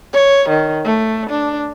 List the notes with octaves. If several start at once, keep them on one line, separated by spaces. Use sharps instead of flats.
C#5
D#3
A3
D4